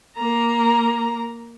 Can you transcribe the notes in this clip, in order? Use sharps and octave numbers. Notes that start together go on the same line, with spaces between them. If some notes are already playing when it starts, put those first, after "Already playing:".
A#3 A#5